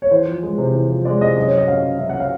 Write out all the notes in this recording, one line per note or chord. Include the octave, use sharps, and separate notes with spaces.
C#5
E2 C5
F3
G#3
C3
E2
F3
G#3 D5
C3 D#5
F#2 D#5
C#5
F#3
D#5
F#2 F5
C#3
F#2 E5
F#5
F#3
F5